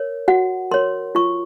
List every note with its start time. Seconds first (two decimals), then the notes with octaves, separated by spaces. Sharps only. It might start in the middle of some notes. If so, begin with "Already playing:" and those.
Already playing: A#4 C#5
0.28 F#4 F#5
0.71 A#4 C#5 C6
1.15 F4 C#6